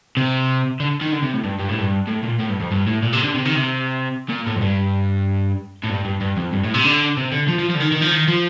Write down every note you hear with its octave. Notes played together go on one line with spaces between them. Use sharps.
C3
D3
D#3
D3
C3
A2
G2
G2
A2
G2
A2
A#2
A2
G2
F2
G2
A2
A#2
C3
D3
C3
D#3
C3
A#2
A2
F2
G2
A2
G2
G2
G2
F2
G2
A2
C3
D3
C3
D3
F3
F3
F3
D3
D#3
D#3
F3
D#3
F3